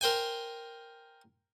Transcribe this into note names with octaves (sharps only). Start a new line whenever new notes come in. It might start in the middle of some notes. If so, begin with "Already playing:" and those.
A#4 C5 G5 G#5